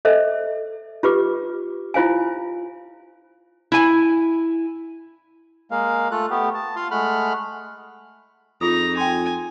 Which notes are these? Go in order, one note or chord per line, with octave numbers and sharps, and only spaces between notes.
A4 C5 D#5 E5
F4 G4 B4 D6
E4 F4 C5 F5 G#5
E4 G#5
G#3 A#3 F5
A3 F4 A4 F#6
A3 B3 G4
A5
F4 F5 C6
G#3 A3 F#5 B5 F6
F2 D#4 F4 G#4 A#5 D#6
G5 G#5 C6